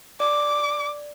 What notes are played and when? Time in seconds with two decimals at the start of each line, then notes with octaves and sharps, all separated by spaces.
0.20 D5 D6